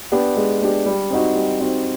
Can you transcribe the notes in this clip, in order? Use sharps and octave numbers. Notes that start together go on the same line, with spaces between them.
B3 D4 G4
G#3
B3 D4 G4
G3
C4 D#4 F#4
G3
C4 D#4 F#4